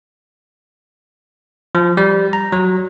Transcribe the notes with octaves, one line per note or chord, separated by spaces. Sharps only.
F3
G3
A#5
F#3